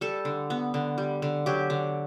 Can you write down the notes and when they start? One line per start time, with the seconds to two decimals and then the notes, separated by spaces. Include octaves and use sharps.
0.01 G3 A4
0.25 D3
0.50 B3
0.74 D3
0.98 G3
1.22 D3
1.46 F#3 G4
1.70 D3